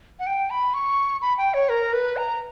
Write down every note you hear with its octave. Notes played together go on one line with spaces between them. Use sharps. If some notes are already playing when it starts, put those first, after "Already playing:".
F#5
G5
B5
C#6
B5
G5
C#5
A#4
B4
A#5